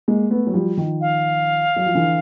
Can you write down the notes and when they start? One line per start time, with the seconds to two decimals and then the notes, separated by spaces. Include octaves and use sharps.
0.08 G#3 A#3
0.31 A3 B3
0.47 F#3
0.54 F3 G3
0.77 D#3 F3
1.01 F5
1.76 F#3
1.86 F3
1.95 D3 E3